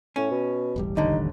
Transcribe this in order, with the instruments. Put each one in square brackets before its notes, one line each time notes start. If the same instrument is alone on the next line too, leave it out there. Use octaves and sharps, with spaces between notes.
[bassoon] A2 [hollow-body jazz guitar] C#4
[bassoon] B2
[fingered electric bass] E1 A1 G3
[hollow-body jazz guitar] D#2 D3 [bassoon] D#4